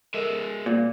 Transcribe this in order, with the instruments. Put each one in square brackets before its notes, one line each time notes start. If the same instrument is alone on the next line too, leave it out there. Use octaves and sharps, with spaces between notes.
[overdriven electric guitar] G#3 E5 [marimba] A4 A#4 D#5
[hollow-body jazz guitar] A#2 [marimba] A#3